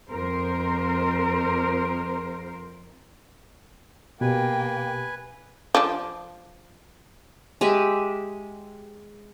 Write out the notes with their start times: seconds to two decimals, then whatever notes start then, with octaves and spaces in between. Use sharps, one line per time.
0.11 F2 A#4 C5
4.21 B2 A#3 G4 B4 G5 G#5
5.75 F3 D4
7.61 G#3 G4 E5